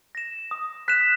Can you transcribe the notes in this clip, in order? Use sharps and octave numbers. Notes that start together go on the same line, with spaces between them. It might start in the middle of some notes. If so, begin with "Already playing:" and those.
A#6 E7
D#6
F#6 B6 E7